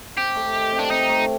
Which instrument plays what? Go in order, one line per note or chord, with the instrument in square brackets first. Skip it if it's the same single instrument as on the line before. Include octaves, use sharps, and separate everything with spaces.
[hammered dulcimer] C3 [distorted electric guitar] G4
[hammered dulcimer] A3
D#3
C3
[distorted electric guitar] D4
[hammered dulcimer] C3 [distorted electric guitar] D#4
[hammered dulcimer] A3